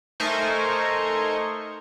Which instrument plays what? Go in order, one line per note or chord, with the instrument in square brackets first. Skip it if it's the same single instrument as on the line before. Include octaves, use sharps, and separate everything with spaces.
[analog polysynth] A3 D#4 A#4 C5 G#5 C#6